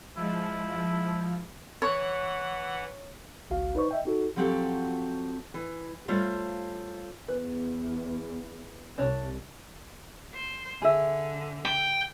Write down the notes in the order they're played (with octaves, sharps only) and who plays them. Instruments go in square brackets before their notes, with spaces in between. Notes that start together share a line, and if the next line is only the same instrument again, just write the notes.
[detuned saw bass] F3 [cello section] G#3 [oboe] E4
[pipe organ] E3 F#5 [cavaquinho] C#5
[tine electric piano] G#1 C#2 F#4 F5
D#4 B4 C5 D5 C#6
D#5 E5 G5
D#4 F#4 A4
[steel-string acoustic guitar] F3 F#3 C4 F#4 G4 A4
E3
G3 A3 F4 C5 C#5 F5
[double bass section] E2 [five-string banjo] B4
[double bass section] C2 C3 [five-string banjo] D4 C#5
[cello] C5
[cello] D3 [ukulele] G#4 E5
[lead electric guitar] G5